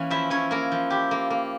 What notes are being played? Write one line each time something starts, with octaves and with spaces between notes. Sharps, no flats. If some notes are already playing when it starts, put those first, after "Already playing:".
Already playing: E3 A#3 C#4 C#5
F3 E4 E5
C#4 E4 C#5
A#3 E4 A#4
F3
E4 G4
A#3
A#3